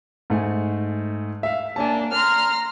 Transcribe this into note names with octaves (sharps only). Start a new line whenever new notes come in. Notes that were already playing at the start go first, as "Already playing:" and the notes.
G#2 A3 G#5
E5 F5
A#3 D4 G#5 A5
A#5 C6 F6